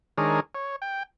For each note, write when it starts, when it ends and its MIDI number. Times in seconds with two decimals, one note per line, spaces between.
0.18 0.40 51
0.18 0.40 56
0.18 0.40 62
0.18 0.40 68
0.18 0.40 70
0.18 0.40 73
0.55 0.76 73
0.82 1.03 79